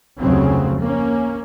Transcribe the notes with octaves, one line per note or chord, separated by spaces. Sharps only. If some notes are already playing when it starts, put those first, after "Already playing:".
F1 D2 C#3 F#3 C4
A#3 C#4